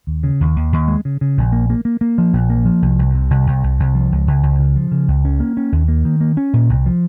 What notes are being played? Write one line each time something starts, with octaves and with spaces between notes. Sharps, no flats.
D#2
C#3
D#2
D#2
D#2
G#3
C#3
C#3
A#1
A#3
A#3
A#3
A#3
F3
A#1
A#3
F3
C2
C2
C3
C2
C2
C2
C2
F3
C#2
C#2
C#2
C#3
F3
C#3
C#2
C#4
A#3
C#4
D#2
A#3
D#3
A#3
C#4
A#2
C2
F3